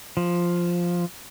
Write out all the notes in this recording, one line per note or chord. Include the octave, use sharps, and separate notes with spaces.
F3